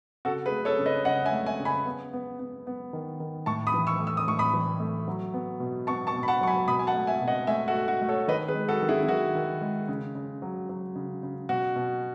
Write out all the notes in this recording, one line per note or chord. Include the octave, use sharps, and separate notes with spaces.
C#3 F#4 A4
G#4 B4
A3
A4 C#5
C#3
B4 D#5
C#3 D#5 F#5
E5 G#5
A3
E5 G#5
C#3
G#5 B5
B3
B3
B3
B3
D#3
D#3
A2 A5 C#6
B5 D#6
E3
C#6 E6
A3
E6
D#6
A2 C#6
B5 D#6
E3
A3
F#3
B3
B2
B3 A5 C#6
A5 C#6
B2
B5
F#5 A5
F#3 C#6
G#5 B5
B2 B5 D#6
G#5
F#5 A5
A3
E5 G#5
B2
D#5 F#5
A3 E5 G#5
F#4 A4
A3
F#4
A3
A4 C#5
D#3 B4 D#5
G#4 B4
G#3
F#4 A4
D#3
E4 G#4
E4
D#3 F#4
D#3
G#3
C#3
C#3
F#3
F#3
C#3
C#3
B2 F#4
B2